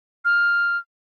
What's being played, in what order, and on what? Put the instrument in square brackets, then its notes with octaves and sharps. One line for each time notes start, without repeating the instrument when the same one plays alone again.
[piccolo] F6